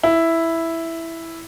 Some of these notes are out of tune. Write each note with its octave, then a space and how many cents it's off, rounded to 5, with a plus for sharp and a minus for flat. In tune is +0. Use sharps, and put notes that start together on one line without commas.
E4 +0